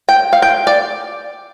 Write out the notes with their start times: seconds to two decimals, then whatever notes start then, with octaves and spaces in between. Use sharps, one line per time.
0.09 G5
0.33 F5
0.42 G5
0.67 D5